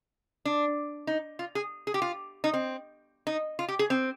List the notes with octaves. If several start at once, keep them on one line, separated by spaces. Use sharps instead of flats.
D4
D#4
F4
G#4
G#4
G4
F4
D#4
C4
D#4
F4
G4
G#4
C4